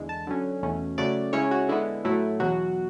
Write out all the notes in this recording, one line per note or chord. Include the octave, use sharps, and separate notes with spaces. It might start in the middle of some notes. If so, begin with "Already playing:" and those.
Already playing: E2 D3 G#3
A5
D3 F#3 C#4
E2 B2 A3 C#4
C#3 F#3 A3 D5
C#3 G#3 C#4 E4 C#5
F#4
D3 G#3 B3 E4
A2 F#3 A3 E4
E2 B2 F#3 F#4